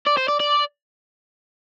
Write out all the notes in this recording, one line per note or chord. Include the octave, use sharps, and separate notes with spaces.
D5
C5
D5
D5